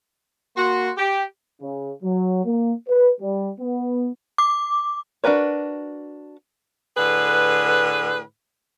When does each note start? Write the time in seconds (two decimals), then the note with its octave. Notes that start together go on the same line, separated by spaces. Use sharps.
0.57 A#3 F#4 C6
0.97 G4
1.61 C#3
2.03 F#3
2.45 A#3
2.88 B4
3.20 G3
3.59 B3
4.38 D6
5.24 D4 F#4 A#4 B4 C#5
6.97 A2 D3 G#4 B4